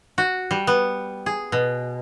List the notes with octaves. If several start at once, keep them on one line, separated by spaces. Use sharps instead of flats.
F#4
G3
B3
G#4
B2